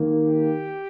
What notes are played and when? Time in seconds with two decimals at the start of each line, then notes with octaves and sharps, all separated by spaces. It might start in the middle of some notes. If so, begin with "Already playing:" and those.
Already playing: D#3 A#3
0.12 G4